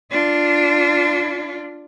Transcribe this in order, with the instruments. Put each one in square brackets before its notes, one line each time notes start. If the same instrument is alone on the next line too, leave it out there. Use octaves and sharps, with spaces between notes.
[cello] D4 F4